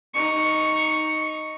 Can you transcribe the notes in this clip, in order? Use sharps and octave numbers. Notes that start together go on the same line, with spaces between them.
D#4 C#6